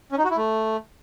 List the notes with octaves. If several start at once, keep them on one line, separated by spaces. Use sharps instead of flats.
C#4
D#4
F#4
E4
A3